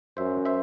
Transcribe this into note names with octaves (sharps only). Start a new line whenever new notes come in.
F#2 C5 E5
C5 E5